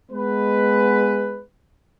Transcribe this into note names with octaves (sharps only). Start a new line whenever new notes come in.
G#3 B3 B4